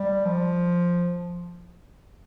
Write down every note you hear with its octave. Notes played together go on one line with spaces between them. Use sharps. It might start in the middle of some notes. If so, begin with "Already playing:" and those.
Already playing: G3
F3